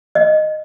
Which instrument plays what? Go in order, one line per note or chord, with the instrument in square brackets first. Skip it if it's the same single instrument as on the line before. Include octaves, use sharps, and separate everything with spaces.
[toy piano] D#5